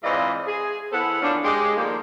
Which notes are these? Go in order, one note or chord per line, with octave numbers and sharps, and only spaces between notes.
G#2 E3 C4 F4 D5 D#5
G#4
E3 B3 E4 A4 C5 F#5
E3 F3 A#3 C#4 D4
G#3 G4
D#3 F3 G3 A3 A#3